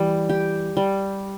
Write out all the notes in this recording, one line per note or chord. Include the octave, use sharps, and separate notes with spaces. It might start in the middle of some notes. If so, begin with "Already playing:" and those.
Already playing: E3 G3
G4
G3